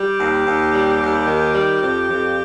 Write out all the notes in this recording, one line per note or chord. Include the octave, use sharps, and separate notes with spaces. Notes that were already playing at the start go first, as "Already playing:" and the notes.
Already playing: G3 G4
D#2
D#2
G3
D#2
D#3
G3
F2
F2